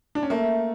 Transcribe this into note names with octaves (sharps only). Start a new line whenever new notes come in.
D4
C#4
A3 A#3